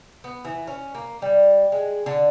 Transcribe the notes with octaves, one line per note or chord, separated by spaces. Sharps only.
B3
E3
C#4
A#3
G3
G#3
D3